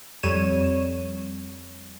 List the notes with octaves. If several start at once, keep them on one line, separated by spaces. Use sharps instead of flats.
F2 G3 C#5 D#7 E7